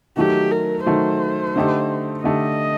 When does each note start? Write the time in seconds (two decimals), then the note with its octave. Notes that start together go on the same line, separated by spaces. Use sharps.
0.17 D#3 F#3 A3 G4
0.51 A#4
0.86 D#3 F#3 A3 C5
1.56 D3 A3 D#4 G4
2.24 D3 A3 D#4 G4 D#5